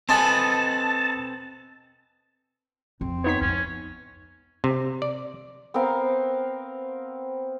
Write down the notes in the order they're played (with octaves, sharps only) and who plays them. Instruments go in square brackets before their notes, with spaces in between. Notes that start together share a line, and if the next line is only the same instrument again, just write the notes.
[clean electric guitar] C4 A4 B4 [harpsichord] D#5 G#5 C6 [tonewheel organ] A5
[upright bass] F2 [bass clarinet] C4
[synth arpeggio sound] B3 D#4 B6 [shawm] C#5
[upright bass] F2 G#2 [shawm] C#4
[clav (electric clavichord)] C3
D5
[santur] B3 C4 A#4 F5